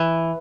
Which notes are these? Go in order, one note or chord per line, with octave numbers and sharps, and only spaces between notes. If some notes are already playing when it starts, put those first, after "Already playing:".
Already playing: E3